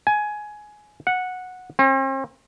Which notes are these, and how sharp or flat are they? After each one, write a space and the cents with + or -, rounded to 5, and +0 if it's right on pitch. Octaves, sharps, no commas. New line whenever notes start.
G#5 +15
F#5 -10
C4 +45